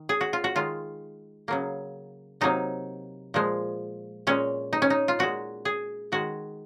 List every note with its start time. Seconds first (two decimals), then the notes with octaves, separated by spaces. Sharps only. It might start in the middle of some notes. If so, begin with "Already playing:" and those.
Already playing: D#3
0.09 G#4
0.21 F#4
0.33 F4
0.44 F#4
0.56 D#3 G#3 F4
1.48 C#3 F#3 A#3
2.41 C3 F#3 A#3 D#4
3.34 A#2 F3 G#3
4.27 A#2 G#3 C#4
4.73 D#4
4.82 C#4
4.90 D#4
5.08 F4
5.19 A#2 G#3 F#4
5.65 G#4
6.12 D#3 G#3 F#4